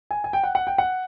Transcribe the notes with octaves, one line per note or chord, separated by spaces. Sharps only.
G#5
G#5
G5
F#5
F#5
G5
F#5